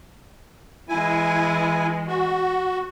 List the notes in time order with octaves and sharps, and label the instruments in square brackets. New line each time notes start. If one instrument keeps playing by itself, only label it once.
[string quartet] E3 G#3 [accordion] E4 G#5
[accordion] F#4